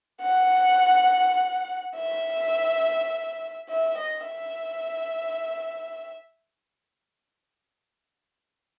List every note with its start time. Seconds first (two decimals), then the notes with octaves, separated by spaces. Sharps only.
0.23 F#5
1.96 E5
3.69 E5
3.98 D#5
4.27 E5